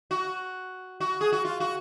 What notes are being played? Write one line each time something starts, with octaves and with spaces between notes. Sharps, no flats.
F#4
F#4
G#4
F#4
F4
F#4